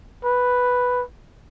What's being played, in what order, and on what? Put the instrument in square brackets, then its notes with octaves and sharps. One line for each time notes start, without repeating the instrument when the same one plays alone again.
[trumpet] B4